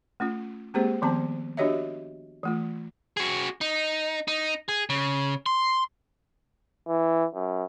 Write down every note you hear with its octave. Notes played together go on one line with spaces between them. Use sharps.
A3 C#4 F4
G#3 A#3 C4 G4 G#4 C5
D#3 F3 B3 C4 A5
D4 F#4 G4 C#5 D#5 E5
E3 A3 F4
F#4 G#4
D#4
D#4
G#4
C#3
C6
E3
F#2